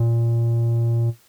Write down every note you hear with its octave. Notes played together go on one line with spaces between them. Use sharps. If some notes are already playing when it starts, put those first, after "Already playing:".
Already playing: A#2